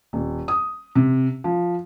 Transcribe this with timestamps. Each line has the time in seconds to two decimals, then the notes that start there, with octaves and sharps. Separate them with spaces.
0.13 D#1
0.48 D#6
0.95 C3
1.44 F3